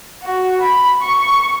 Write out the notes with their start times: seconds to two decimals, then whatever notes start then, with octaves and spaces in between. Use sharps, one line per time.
0.23 F#4
0.60 B5
1.01 C#6